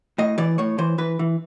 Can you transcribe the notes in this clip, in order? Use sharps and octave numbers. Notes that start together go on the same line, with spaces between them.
A2 D#5
E3 D5
A2 C#5
E3 C5
E3 B4
E3